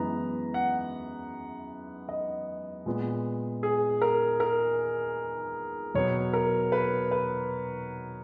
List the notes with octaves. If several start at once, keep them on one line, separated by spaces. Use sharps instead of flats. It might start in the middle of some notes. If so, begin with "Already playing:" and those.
Already playing: F#2 E3 G#3 B3 A#5
F#5
D#5
A#2 G#3 B3
G#4
A#4
A#4
B2 F#3 B3 C#5
A#4
B4
B4